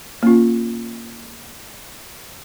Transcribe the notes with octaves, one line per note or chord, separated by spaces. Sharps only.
A#3 C#4 F4